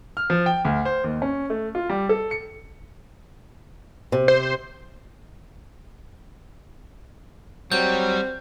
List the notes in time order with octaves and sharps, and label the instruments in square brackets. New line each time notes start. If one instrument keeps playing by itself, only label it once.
[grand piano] F6
F3
G5
D2
C5
D#2
C#4
A3
F4
G3
A4
C#7
[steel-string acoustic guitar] C3
[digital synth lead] C5
[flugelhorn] F#3 [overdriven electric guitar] G3 [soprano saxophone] C4 [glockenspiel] G6